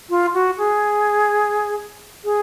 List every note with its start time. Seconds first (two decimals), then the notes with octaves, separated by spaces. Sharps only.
0.10 F4
0.34 F#4
0.58 G#4
2.24 G#4